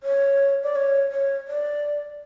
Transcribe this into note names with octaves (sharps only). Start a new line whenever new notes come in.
C#5
D5
C#5
C#5
D5